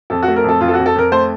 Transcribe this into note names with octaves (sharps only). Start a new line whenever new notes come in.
F2 A4
F#4
A3
A#4
F2 A4
F2 F4
A4
F#4
F2
A4
F2 A#4
A3 C5